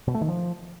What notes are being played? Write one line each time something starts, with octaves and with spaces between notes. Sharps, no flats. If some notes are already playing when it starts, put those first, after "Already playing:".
B2
A3
D#3
F3